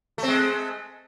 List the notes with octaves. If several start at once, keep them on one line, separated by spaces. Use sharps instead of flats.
G#3 A3 C4